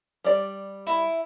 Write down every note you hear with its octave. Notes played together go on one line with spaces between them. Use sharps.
G3 D5
E4